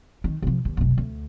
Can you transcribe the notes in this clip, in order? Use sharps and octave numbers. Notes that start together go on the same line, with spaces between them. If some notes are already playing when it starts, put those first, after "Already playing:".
D#3
C3 F3
D#2
F1 B1
D2